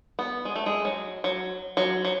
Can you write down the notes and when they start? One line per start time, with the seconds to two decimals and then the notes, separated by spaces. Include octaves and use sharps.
0.19 B3
0.45 G#3
0.56 A3
0.66 G#3
0.85 F#3
1.24 F#3
1.77 F#3
2.05 F#3